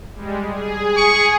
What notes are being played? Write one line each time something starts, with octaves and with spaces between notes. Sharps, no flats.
G3 G#3
G#4
C#6